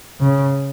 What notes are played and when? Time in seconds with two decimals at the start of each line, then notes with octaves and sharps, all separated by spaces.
0.20 C#3